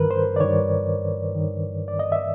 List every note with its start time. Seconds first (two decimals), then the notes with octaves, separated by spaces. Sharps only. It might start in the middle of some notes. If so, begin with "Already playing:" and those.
Already playing: G2 D#3 A#4 B4
0.11 C5
0.36 D5
0.40 G2 D#3 C#5
1.32 G2 D#3
1.88 D5
1.99 D#5
2.12 E5